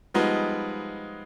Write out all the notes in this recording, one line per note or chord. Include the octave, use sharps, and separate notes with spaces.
F3 G3 G#3 B3 D#4